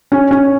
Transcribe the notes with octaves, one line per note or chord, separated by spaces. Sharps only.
C#4
C#4